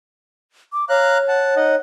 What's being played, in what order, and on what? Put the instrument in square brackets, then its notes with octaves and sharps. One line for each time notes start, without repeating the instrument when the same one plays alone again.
[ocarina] D6
[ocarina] C#5 [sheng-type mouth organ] F5 A#5 F#6
[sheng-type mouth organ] F#5 A5
D#4 D#5 F#5